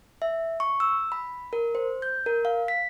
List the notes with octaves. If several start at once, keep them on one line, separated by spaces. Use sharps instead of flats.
E5
C#6
E6
B5
A#4
C5
G6
A#4
F5
B6